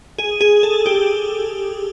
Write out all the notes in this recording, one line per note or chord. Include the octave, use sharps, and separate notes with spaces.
G#4
G#4
A4
G4